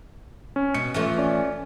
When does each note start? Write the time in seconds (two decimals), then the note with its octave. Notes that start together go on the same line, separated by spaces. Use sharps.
0.56 C#4
0.74 B2 C#7
0.94 E3 F3 A3
1.18 C#4 D5